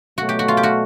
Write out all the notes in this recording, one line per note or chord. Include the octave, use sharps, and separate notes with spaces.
B2 F#3 A3 F#4
G4
F#4
F4
G4
F#4